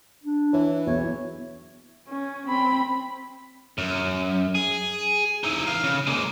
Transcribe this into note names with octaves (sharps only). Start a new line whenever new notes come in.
D4
E3 C#5
B1 E2 C#5 E5
C#4
C4 B5
F#2
G#4
D#4 E4
E3 F5
C#3
G#3 A#3